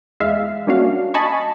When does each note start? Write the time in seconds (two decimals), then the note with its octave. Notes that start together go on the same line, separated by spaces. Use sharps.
0.20 E2 G#3 E5 F5
0.67 G3 A#3 C#4 D4 F#4 F5
1.14 D#5 G#5 A5 B5 C#6